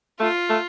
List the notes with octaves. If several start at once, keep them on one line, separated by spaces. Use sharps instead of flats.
A3 F4
A3